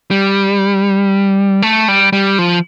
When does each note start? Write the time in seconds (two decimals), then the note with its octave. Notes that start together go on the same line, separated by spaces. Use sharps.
0.11 G3
1.62 A3
1.88 G3
2.13 G3
2.38 F3